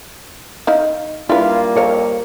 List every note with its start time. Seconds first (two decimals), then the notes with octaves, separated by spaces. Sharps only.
0.67 D#4 E4 F5
1.29 G3 A#3 D4 E4 F4 B4
1.77 F2 A#4 C#5 F5